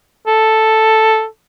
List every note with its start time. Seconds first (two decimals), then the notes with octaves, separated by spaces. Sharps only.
0.27 A4